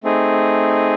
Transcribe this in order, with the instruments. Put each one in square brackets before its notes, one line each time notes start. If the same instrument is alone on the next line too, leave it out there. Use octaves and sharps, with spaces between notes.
[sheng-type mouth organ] A3 C4 D#4 G#4